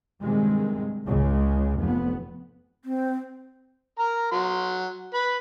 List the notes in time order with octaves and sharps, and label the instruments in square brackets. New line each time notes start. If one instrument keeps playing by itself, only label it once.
[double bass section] G2 C3 D#3 G#3
C#2 C#3 G#3
F1 F2 B3
[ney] C4
[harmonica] A#4 A#5
F#3 C6
B4 B5